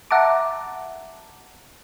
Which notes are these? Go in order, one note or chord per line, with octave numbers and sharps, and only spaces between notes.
E5 F#5 A5 A#5 D6